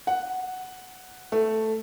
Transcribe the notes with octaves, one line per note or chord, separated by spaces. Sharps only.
F#5
A3